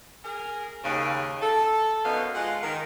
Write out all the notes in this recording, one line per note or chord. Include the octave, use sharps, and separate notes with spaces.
G#4 A#4
D#2 C#3
A4
F#2 B2 D3 B3 D#4 F5
G#3 F4 F#5
D#3